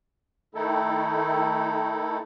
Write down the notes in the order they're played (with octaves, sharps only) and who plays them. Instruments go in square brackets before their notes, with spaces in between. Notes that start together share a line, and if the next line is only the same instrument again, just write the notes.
[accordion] D#3 A3 D#4 E4 A4